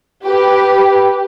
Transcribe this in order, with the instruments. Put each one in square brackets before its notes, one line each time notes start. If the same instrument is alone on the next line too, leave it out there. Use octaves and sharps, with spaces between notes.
[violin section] G4 B4